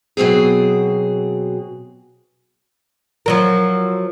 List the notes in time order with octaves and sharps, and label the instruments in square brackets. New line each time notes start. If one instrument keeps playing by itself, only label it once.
[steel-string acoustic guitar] B2 F#3 C4 G#4
[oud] F3 F#3 A#4